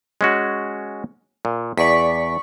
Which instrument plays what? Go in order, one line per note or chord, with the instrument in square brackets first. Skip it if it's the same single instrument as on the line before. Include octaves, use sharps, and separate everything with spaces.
[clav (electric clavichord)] G#3 C#4 F#4
A#2
[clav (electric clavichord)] E2 [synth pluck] D5 C#6 B6